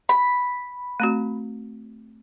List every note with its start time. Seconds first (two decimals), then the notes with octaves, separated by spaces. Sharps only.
0.09 B5
1.00 A3 C4 F#4